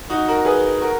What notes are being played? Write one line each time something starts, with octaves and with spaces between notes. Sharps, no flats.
D#4 F#4
F#4 A#4
G#4 B4
F#4 A#4